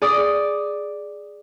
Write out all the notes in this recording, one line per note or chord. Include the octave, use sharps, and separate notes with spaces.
G#4 D5 D#6